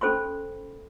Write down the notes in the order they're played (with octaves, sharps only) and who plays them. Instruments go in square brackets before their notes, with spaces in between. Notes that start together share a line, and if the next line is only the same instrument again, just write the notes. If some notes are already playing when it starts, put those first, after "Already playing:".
[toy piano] C#4 A4 C5 B5 C6